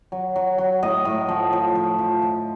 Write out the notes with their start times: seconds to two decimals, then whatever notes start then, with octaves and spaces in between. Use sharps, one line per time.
0.12 F#3
0.36 F#3
0.58 F#3
0.83 A2 D#5
1.05 A2
1.29 F3
1.53 F3
1.75 F3
1.98 F3
2.22 F3